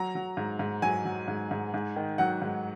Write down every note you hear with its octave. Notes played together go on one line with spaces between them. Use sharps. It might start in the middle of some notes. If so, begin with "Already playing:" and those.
Already playing: F#3 A#5
F#3
G#2
G#2
F#3 G#5
F#3
G#2
G#2
G#2
D#3
F#3 F#5
G#2